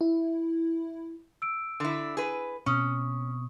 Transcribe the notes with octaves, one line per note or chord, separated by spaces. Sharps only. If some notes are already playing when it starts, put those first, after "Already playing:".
E4
E6 D7
D3 E4
G#4 B4
B2 C4 C#4 C#6 D#6